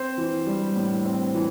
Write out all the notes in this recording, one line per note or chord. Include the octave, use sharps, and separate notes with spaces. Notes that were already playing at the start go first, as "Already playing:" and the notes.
Already playing: C4 C5
E3
G3
A2
C4
E3